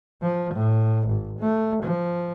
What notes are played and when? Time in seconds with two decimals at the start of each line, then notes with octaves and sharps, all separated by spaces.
0.22 F3
0.54 A2
1.08 G#1
1.39 A3
1.83 F3